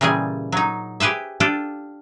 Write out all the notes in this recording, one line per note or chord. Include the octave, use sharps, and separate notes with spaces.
A#2 C#3 E3 G3 G#4
F#3 D#4
G4 G#4 B4 C5 E5
D4 F4 G4 A4